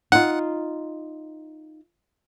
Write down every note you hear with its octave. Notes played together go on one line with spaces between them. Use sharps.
D#4 F4 F#5